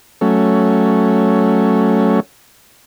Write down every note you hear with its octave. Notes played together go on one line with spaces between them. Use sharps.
F#3 A3 C#4